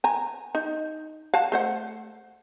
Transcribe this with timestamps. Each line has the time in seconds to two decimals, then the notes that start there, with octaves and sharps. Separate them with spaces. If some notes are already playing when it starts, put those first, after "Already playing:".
0.04 G#5 A#5
0.55 D#4
1.34 F5 F#5 A5
1.52 A3 C5 F#5